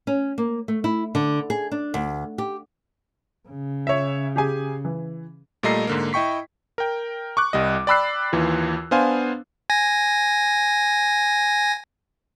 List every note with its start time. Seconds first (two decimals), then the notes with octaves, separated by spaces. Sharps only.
0.07 C#4
0.38 A#3
0.68 A3
0.84 E4
1.15 D3
1.50 G#4
1.72 D4
1.94 D2
2.38 G4
3.48 C#3
3.87 C#5 E5
4.36 G4 G#4 G#5
4.85 E3
5.63 A#2 G3 A3 D#5 A#5 C7
5.87 G#2 D3 A#3
6.13 E4 D#5 G5 C#6 B6
6.78 A#4 G5
7.37 C#6 D6 F#6
7.53 C2 G3 D#5
7.87 D5 G5 B5 E6 F#6 C7
8.33 D#2 E3 F4
8.91 B3 D4 C5 F5 G#5
9.70 G#5 A#6